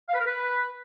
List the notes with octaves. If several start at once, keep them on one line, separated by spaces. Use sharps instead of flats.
F5
B4
A#4
B4